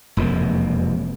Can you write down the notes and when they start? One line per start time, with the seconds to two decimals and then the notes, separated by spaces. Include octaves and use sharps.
0.17 E1 F2 C3 A#3